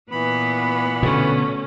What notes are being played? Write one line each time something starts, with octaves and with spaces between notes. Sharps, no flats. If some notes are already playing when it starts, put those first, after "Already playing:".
A#2 E3 B3 B5
B2 D3 A3 C#4